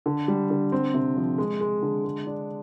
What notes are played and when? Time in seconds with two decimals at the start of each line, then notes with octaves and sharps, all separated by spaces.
0.06 D3
0.28 G3
0.50 D3
0.72 C4
0.94 C3
1.17 F3
1.38 G#3
1.61 G#3
1.82 D3
2.05 G#3
2.27 D4